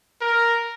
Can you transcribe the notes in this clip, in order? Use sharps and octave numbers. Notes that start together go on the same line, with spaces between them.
A#4